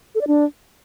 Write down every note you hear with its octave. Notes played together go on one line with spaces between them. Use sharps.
A4
D5
D4